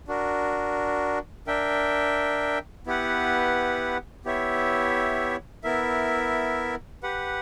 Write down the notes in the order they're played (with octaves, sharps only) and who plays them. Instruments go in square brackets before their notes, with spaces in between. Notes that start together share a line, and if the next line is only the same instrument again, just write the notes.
[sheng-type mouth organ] D4 F#4 A#4
D4 A#4 E5 G5
B3 E4 G4 B4 F#5
B3 E4 G4 C#5 E5
B3 E4 A#4 E5
G4 B4 F#5